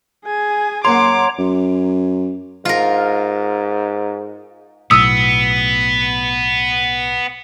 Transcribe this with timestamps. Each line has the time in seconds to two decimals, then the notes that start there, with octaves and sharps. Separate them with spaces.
0.25 G#4 G#5
0.85 F#2 A#3 C#5 F#5 A#5 C6 D6
1.38 F#2
2.65 G#2 F4 A#4
4.91 B1 A2 B3 D#6 E6